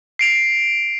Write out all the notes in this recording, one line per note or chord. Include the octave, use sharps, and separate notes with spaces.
C7 D7 F7